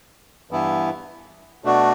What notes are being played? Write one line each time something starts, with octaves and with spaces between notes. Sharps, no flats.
G2 E3 B3 E4
B2 A3 D4 F#4